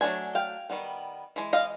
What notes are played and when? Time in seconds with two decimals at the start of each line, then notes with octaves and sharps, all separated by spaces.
0.01 F#3 A3 D4 G#5
0.35 F5 G5
0.70 D#3 G3 B3
1.36 E3 G#3
1.53 D#5 F5